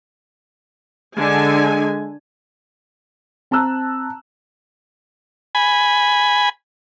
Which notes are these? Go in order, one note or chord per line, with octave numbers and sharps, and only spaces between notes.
D3 G#3 G#5
C4 A5 A#5 E6 F#6
G#5 B5